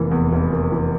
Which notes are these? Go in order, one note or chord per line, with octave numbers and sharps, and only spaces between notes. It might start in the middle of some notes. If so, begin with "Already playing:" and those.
Already playing: F1 E3 A#3
E2
F1
A#3
E3